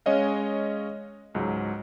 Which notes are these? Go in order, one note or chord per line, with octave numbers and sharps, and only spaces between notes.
G#3 C#4 C#5 D#5 F5
C#2 G#2 F#3